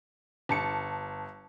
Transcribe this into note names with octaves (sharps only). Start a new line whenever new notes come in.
G1 A5 C#7